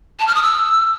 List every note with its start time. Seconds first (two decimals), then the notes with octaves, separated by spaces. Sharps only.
0.19 A5
0.27 F6
0.35 D#6
0.43 E6